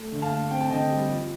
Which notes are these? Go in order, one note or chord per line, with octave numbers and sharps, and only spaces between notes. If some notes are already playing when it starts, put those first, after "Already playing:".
Already playing: A3
D3
F5 A5
A3
C4 G5
A5
D3 D#5 G5
G3
F3